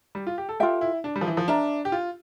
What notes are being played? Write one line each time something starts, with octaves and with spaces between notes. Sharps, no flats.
G3
F4
G4
A4
F4 G4 A4 E5 G5
E4
D4
G3
F3
E3
F3
D4 A#4 E5 A#5
G4
F4